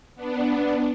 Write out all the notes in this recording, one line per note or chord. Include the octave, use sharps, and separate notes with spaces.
B3 D4